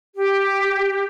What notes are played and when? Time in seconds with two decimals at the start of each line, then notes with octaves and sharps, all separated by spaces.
0.16 G4